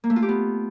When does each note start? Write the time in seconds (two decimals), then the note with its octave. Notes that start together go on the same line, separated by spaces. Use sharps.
0.04 A#3
0.10 A3
0.16 F4
0.22 G4
0.29 B3